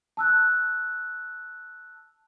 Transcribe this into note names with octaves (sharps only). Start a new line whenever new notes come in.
A5 E6 F#6